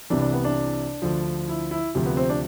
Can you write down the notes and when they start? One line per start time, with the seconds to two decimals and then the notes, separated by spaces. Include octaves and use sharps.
0.10 C2 C3 E3 D4
0.22 D4
0.33 B3
0.45 D4
1.02 D2 D3 F3
1.49 E4
1.71 E4
1.95 D2 C3 F3
2.06 B3
2.17 C4
2.29 D4